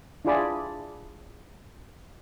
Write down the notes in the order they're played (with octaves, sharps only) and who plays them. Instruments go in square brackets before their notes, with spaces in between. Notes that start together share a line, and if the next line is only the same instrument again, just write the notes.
[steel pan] D4 E4 F4 G#4 D5 B5